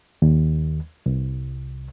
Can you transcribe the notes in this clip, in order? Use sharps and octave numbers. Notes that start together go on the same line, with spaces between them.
D#2
C2